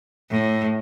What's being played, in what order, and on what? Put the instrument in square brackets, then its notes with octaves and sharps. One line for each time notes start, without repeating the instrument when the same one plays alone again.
[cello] A2